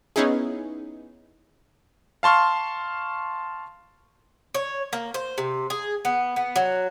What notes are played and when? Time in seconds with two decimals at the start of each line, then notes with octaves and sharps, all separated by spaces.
0.16 B3 C#4 D#4 E4 G#4
2.23 F5 A5 C6 C#6 F6
4.54 C#5
4.93 A#3
5.14 C5
5.38 C3
5.70 G#4
6.05 B3
6.36 B3
6.56 F#3